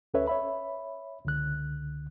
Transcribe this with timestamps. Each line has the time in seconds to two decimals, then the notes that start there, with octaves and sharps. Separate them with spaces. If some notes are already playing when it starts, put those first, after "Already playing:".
0.14 D2 C#4 A4 B4 C#5 E5
0.27 C#5 E5 B5
1.25 C#2 D3 F#6